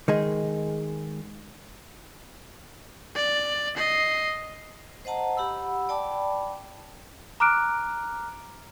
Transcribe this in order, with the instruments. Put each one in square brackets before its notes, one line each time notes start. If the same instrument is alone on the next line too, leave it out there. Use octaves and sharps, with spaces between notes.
[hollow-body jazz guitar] D#3 G#3 G#4
[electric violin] D5
D#5 C7
[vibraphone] C5 D#5 F#5 A5 A#5
G4 F#5 B5 E6
D5 G5 A5 B5 D6
[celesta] A#5 D6 F6 F#6 D7